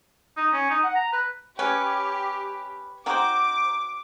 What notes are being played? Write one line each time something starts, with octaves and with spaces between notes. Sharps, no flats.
D#4
C#4
D#4
F#5
A#5
B4
C#4 G4 B4 C#5
C4 D#4 F#4 A#4 C5 D6